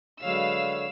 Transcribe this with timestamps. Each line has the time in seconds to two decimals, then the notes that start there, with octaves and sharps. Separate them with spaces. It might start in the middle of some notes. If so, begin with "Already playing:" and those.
0.22 D3 F#3 G#3 B4 C#5 F5 E6